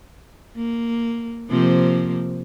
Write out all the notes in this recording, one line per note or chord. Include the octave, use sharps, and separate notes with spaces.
A#3
C3 F3 A#3